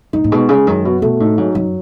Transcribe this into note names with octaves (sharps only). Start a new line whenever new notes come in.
G#2 D#4
A2
B2 G#3
C#3 G#3
F#2 D#3
B2 F#4
B2 A3
A2 D#4
G#2 F#3
F#2 F#3